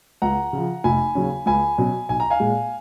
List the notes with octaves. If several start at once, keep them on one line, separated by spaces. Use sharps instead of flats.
C#2 F#5 A#5
C#3 F3
F1 G#5 B5
D#2 C#3 F#3 C#4
C#2 G#5 B5
B2 F#3 C#4
B1 G#5
A#5
F5 G#5
A#2 G#3